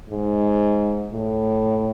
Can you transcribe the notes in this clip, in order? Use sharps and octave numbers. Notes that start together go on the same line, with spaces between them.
G#2
A2